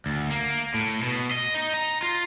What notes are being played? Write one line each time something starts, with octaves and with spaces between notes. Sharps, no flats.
D2
A#3
A2
B2
D#5
D#4
A#5
F4